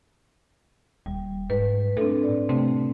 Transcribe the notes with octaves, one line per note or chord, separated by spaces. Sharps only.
D#1 G3
G#2 B4
A2 C4 D4 A4
D5
C3 A3 C4